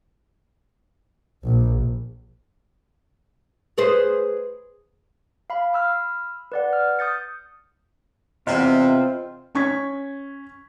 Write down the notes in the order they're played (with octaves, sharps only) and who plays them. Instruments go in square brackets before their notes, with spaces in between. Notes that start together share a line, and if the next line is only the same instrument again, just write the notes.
[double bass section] A#1
[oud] G#4 B4 C5
[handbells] F5 B5
B5 E6 F6
B4 D5 F#5
F6
D#6 G6 A6 C#7
[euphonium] E2 [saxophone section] C3 [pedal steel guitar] C4 F4 [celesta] D#5
[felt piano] C#4 C#6 G#6 B6